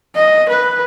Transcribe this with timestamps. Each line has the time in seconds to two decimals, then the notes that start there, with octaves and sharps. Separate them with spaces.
0.14 D#5
0.48 B4